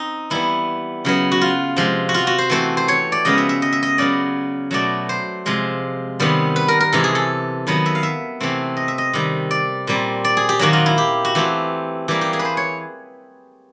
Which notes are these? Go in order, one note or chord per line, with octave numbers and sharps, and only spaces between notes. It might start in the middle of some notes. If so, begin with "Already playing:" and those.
Already playing: C4 D#4
E3 G3 B3 E4
C#3 F#3 B3
F#4
F4
C3 F3 G#3
F#4
F4
F#4
C5
E3 A3 C4 C5
C5
C#5
D5
C#3 F3 G#3 B3 D#5
E5
E5
D#5
E5
D#5
C#3 F#3 B3 D5
B2 F#3 A3 D5
C5
C3 F3 G#3
C3 D#3 G3 B3
B4
A#4
A#4
C3 E3 G#3 A4
G#4
A4
D#3 F#3 B3 B4
E5
F5
E5
C3 E3 A3 C4
D#5
E5
D#5
C3 D#3 G3
D5
A#2 G3 C4
D5
G#4
G4
D#3 F#3 A#3 F#4
F4
E4
G4
F#4
E3 A3 C4 G4
E3 G3 A#3 G4
G4
G#4
B4
C5
C#5